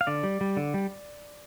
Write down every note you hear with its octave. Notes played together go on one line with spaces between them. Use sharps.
F5
D3 D5
G3
G3
D3
G3